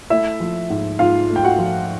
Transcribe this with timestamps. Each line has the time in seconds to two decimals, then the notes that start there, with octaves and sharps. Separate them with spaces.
0.10 A3 E4 E5
0.40 F3
0.70 G#2
0.99 G#2 F4 F5
1.30 A3
1.36 G5
1.43 F#4 F#5
1.58 F3